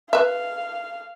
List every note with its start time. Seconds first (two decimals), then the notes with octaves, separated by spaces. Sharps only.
0.13 B4 E5 F5